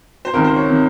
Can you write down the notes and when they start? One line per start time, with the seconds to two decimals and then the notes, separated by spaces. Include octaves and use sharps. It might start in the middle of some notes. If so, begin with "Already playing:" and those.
0.25 C5
0.33 C#2 C3 D#3 A#4
0.44 C5
0.56 C#5
0.69 C3 D#3